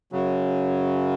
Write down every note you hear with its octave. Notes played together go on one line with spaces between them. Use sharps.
F#2 C#3 F#3